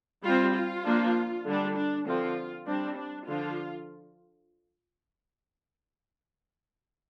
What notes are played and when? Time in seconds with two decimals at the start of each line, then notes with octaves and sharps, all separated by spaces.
0.23 G3 F4
0.29 C4
0.54 F4
0.85 F3 A#3 D4
1.45 D3 G3 D4
1.76 D4
2.05 D3 F3 C4 F4
2.67 G3 C4 D4
2.96 D4
3.27 D3 F3 D4 F4